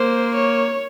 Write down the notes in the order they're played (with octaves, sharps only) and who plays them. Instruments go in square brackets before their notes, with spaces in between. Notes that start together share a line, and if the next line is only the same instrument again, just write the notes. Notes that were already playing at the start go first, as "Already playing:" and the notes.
Already playing: [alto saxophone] A#3 [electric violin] C5
[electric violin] C#5